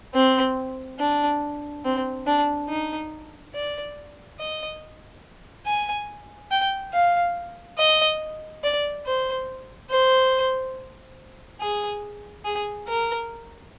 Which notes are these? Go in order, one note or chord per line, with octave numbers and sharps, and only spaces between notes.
C4
D4
C4
D4
D#4
D5
D#5
G#5
G5
F5
D#5
D5
C5
C5
G#4
G#4
A#4